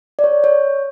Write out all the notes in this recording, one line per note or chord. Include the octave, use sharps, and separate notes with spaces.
D5
C#5
C#5